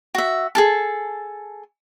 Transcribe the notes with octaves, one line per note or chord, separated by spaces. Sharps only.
F#4 E5
G#4 A4 A5